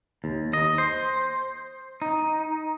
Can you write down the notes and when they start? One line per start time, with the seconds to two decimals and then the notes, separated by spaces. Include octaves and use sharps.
0.24 D#2
0.53 D#5
0.78 C5
2.02 D#4